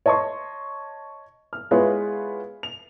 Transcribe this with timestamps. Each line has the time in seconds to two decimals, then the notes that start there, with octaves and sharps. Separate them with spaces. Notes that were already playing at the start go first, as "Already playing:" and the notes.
0.06 C#5 D#5 A5 C6 C#6
1.53 F6
1.71 G#3 B3 E4 F4 B4 C#5
2.63 F7